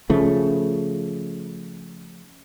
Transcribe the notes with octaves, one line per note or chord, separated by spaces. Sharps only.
C#3 F3 A3